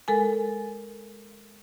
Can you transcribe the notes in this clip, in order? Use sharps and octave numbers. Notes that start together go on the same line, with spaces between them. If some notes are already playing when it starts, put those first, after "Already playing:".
G#3 A4 A#4 G#5